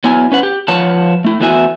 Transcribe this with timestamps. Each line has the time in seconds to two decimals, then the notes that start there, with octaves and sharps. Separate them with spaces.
0.04 F#3 B3 E4 G#5
0.32 C#4 B4 F#5
0.43 G4
0.68 F3 F4 B4 C#5 F#5 A5
1.25 A3 E4
1.40 E2 A3 B3 F#4 E5 G#5